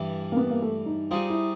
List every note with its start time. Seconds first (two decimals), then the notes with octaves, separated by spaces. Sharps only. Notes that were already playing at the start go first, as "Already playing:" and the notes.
Already playing: G2 E3 G3
0.32 A#3
0.37 B3
0.50 A#3
0.62 A3
0.86 D#4
1.11 G3 C4 D#4 F4 G#4
1.30 E4